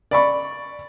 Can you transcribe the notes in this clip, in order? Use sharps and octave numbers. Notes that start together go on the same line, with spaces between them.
D5 B5 C#6